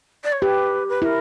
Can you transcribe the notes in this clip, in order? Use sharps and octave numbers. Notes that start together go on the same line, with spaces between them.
D5
C#5
G4 B4
B4
E4 A#4 B4